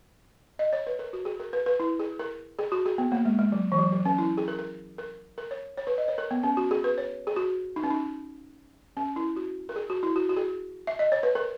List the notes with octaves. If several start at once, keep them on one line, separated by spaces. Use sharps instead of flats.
D#5
C#5
B4
A#4
F#4
G#4
A#4
B4
B4
E4
G#4
A#4
G#4
F#4
G#4
B3
A#3
G#3
G#3
F#3
E3
F#3
F#3
C#4
E4
G#4
A#4
A#4
A#4
A#4
C#5
C#5
B4
D#5
C#5
A#4
B3
C#4
F#4
G#4
B4
C#5
G#4
F#4
D#4
C#4
D#4
C#4
E4
F#4
A#4
G#4
F#4
E4
F#4
F#4
G#4
E5
D#5
C#5
B4
A#4